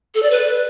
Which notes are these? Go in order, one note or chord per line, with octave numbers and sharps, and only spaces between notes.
A4
D5
B4